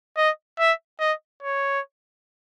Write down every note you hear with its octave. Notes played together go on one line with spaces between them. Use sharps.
D#5
E5
D#5
C#5